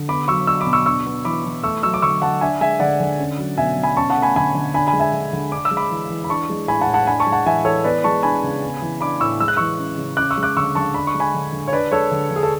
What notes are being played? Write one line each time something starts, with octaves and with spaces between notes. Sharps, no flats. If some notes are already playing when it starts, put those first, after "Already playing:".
Already playing: D3
B3 B5 D6
F#3 C#6 E6
D4 C#6 E6
B5 D6
B2
C#6 E6
D4 C#6 E6
B3
E3 B5 D6
E3
A3 C#6 E6
F#3 C#6 E6
D6
D3 C#6 E6
D3 F#5 A5
D4 E5 G#5
G#3 E5 G#5
D3 D5 F#5
D3
C#4
F#3
B2 E5 G#5
B2
G#5 B5
C#4 A5 C#6
F#5 A5
A3
G#5 B5
D3 G#5 B5
D3
D4 G#5 B5
G#5 B5
G#3
E5 G#5
D3
D3
D4 D6
E6
G#3
B5 D6
E3
E3
B5
D4 A5 C#6
G#3
A2 G#5 B5
F#5 A5
A2
F#5 A5
D4 G#5 B5
A5 C#6
G#3
F#5 A5
E3 E5 G#5
E3 A4 C#5
B3 B4 D5
G#3 A5 C#6
D4 G#5 B5
C#3
B3
E3
D4 B5 D6
A2 C#6 E6
G#3 E6
F#6
E3 C#6 E6
C#4
C#3
C#4 D6 F#6
C#6 E6
G#3
D6 F#6
D3 C#6 E6
D3 A5 C#6
D4 B5
C#6
G#3
G#5 B5
D3
D3
C#5
D4 B4 D5
G#3 A4 C#5
D3
D3
G#4
A4